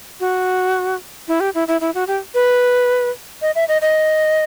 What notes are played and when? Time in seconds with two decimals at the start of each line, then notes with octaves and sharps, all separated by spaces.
0.20 F#4
1.28 E4
1.40 G4
1.55 E4
1.68 E4
1.81 E4
1.95 F#4
2.08 G4
2.35 B4
3.42 D#5
3.55 E5
3.68 D#5
3.82 D#5